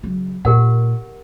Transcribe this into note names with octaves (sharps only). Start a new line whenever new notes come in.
C#3 F#3
A#2 G4 A#4 F#5